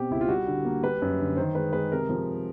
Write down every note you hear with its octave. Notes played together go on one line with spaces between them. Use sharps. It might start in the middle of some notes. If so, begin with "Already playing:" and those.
Already playing: B2 C4 G4
C#2 E4
F4
G3 F#4
D3
A#3
G3 B4
F#2
D3
D#3 C5
G#3 B4
G#3 B4
C3 A#4
F3